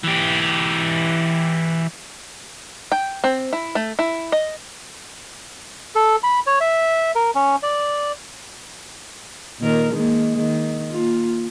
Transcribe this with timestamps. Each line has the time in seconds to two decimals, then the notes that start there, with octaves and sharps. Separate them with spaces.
0.03 E3 G4
2.92 G5
3.24 C4
3.53 E4
3.75 A3
3.99 E4
4.32 D#5
5.95 A4
6.23 B5
6.47 C#5
6.61 E5
7.15 A#4
7.35 C#4
7.63 D5
9.59 A#2 D#3 A#4
9.91 D#3 G#3 A#3
10.38 D#3
10.90 A#3 F4